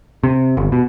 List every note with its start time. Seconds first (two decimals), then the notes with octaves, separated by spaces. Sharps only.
0.24 C3
0.57 G1
0.72 B2